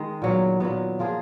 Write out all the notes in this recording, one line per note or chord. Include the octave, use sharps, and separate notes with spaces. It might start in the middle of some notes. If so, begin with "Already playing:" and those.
Already playing: D#3 G#3 D#4
A#2 F#3 B3
A#2 F#3 B3
F3 A#3 F4 G#4